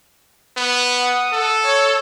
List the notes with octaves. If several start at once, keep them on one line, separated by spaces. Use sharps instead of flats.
B3
F#5 D#6
A4
C#5